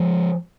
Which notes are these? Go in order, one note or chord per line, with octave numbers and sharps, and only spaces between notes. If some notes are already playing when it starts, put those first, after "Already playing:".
Already playing: F3 G#3